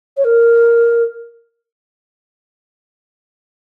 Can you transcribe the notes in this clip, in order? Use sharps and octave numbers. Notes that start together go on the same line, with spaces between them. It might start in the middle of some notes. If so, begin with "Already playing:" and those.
C#5
A#4